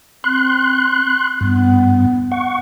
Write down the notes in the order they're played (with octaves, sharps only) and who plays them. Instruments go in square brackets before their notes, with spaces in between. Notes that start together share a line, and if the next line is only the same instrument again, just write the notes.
[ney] C4 [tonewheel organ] C6 F#6
[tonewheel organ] G2 [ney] B3
[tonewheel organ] F#5 C#6